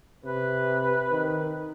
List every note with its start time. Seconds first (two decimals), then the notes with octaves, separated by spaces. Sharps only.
0.25 C3 B4
1.11 D#3